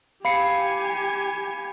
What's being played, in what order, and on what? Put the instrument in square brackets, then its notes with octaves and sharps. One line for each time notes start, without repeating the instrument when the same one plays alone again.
[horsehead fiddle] G4 G#5 [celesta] F5 [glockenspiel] B5 C7 C#7